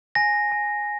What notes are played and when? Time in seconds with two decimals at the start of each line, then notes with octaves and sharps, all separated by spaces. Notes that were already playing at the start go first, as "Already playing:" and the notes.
0.15 G#5 A#6
0.52 G#5